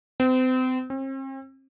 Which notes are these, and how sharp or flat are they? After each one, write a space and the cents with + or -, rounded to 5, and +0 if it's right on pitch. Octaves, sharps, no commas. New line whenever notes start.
C4 -35
C4 +40